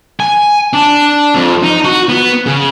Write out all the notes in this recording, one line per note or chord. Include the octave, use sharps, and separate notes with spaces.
G#5
D4
F2
D#4
F#4
B3
C#3